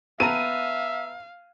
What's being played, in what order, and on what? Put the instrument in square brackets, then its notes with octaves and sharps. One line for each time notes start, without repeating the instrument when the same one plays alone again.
[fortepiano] B3 A5 A#5 [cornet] E5 [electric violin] F5 [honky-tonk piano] D#7